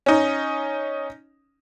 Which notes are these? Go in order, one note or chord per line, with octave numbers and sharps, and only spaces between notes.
C#4 D#4